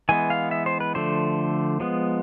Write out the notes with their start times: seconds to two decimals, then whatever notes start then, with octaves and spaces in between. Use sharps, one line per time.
0.09 E3 G#3 B3 G#5
0.30 F5
0.51 E5
0.66 C5
0.80 B4
0.95 D3 F3 A3 C5
1.80 F3 G#3 B3